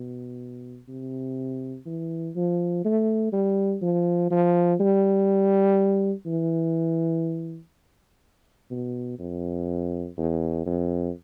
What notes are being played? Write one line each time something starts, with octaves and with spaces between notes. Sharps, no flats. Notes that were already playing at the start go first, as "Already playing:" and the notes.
Already playing: B2
C3
E3
F3
A3
G3
F3
F3
G3
E3
B2
F2
E2
F2